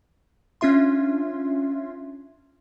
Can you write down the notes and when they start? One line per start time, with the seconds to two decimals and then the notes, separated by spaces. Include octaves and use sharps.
0.61 C#4 D4 F4 E5 C6